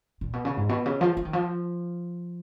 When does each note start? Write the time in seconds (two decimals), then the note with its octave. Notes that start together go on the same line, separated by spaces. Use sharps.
0.21 A#2
0.33 B2
0.45 C#3
0.57 G#2
0.69 B2
0.86 C#3
1.01 F3
1.17 F3
1.25 D#3
1.33 F3